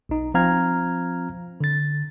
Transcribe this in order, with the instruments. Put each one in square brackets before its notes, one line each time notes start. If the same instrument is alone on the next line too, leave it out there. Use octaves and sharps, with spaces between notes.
[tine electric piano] B1 D#4
F3 C4 F5 A#5 F6 G#6
D3 A6